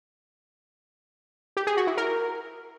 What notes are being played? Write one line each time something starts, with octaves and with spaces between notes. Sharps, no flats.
G4
G#4
F#4
E4
A#4